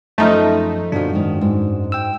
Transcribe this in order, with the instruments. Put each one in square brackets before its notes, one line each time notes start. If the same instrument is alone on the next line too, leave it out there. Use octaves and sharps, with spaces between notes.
[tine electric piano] F#2 F3 [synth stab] A3 D#4
[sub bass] F#2 [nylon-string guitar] A#2 D3 F3 [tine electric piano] D4 F#4
[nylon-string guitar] G#2 D#3
G#2
[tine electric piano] G5 E6